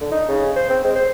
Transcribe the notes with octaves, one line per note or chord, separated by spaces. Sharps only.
D3
D#4
C#3
C5
C4
G#3
C5